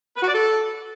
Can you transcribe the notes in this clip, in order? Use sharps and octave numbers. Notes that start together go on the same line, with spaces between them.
B4
F#4
D5
A4